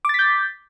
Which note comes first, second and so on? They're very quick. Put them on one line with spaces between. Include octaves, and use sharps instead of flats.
D6 A6 B6 G6